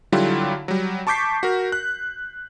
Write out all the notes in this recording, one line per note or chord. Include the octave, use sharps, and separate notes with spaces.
D3 F#3 G3 E4 F4 G4
F#3 G3
A5 C#6 D6 G6 B6 C7
F#4 A#4
F#6